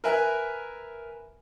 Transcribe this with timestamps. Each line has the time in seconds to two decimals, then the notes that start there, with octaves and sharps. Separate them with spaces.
0.04 A#4 B4 E5 G#5